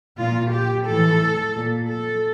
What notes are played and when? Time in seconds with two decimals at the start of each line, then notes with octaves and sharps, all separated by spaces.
0.19 A#2 F4
0.53 G4
0.87 A2 E3 A4
1.55 A#2
1.89 A4